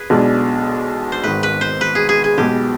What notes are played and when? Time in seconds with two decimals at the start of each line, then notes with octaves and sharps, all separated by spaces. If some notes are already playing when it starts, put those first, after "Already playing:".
Already playing: G#4 B4
0.10 B1 B2 G#3 D4
1.12 C5
1.23 G#1 G#2 D#3 B4
1.43 B4
1.61 C5
1.81 B4
1.95 G#4
2.09 G#4
2.24 G#4
2.38 B1 B2 G#3 G4